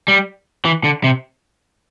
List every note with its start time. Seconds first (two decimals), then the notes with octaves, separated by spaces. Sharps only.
0.08 G3
0.65 E3
0.84 D3
1.04 C3